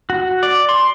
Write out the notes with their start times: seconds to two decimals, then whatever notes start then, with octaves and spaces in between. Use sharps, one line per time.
0.10 F#4
0.43 D5
0.69 C6